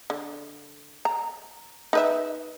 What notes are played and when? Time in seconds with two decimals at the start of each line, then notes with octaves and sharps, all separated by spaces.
0.10 D3
1.05 A#5
1.93 D#4 B4 E5